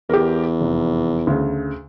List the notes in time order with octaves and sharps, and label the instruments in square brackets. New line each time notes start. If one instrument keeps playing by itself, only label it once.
[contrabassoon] E2 [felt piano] G4 A#4
[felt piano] F1
D2 C#3